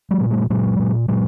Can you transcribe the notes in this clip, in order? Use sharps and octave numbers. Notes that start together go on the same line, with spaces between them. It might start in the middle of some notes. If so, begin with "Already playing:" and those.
F#3 G#3
A#2
G3 A3
A#2 F#3 G#3
A#2
A#2 F#3 G#3